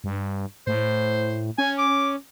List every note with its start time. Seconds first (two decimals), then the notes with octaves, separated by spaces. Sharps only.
0.04 G2
0.67 A2 C5
1.58 C#4 G#5
1.78 D6